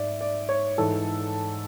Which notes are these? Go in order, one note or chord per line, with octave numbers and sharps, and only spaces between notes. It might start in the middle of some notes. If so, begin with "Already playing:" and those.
Already playing: G#2 D5 E5
D5
C#5
G#2 E3 A4